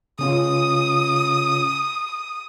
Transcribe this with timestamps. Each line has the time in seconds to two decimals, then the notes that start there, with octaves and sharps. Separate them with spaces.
0.19 C#3 C#4 F4 D#6